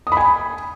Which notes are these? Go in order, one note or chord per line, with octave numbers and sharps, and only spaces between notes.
D#6
B5
G#5